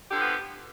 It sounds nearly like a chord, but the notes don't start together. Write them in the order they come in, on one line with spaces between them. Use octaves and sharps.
G4 D3 F3 B3